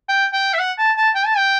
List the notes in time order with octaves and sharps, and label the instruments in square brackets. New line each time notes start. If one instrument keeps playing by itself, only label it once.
[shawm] G5
G5
E5
F#5
A5
A5
G5
A5
G5